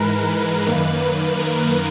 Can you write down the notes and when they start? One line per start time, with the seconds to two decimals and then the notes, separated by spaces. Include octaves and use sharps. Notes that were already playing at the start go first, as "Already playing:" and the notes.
Already playing: G#2 E3 G#3 A#4 B4
0.29 B4
0.66 F#2 D#3 A#3
1.39 A#4